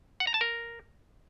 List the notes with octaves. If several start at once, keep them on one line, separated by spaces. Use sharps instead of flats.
F#5
A#5
A5
A#4